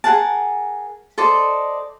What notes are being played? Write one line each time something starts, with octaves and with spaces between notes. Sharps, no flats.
G#4 A#4 F#5 A5
A4 C5 D5 D#5